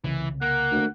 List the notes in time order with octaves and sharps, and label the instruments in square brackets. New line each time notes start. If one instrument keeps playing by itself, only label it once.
[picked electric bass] C2 C#3 [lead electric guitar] E3
[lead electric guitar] A#3 [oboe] F#5
[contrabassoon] D2